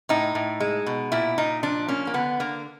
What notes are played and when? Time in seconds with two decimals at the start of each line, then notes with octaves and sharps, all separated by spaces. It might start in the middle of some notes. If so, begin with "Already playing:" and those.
0.09 A2 D#4
0.35 A2
0.60 G#3
0.86 B2
1.12 A#2 E4
1.38 A#2 D#4
1.63 F3 D4
1.88 A#3 C#4
2.07 A#3
2.14 D3 B3
2.40 D3 A#3